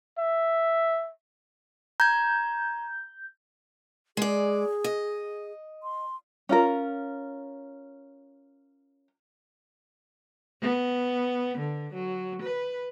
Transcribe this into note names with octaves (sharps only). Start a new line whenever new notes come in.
E5
A#5 G6 G#6
G#3 G#4 D5
D#5
C6
C#4 F4 A#4
B3
D3
F#3
B4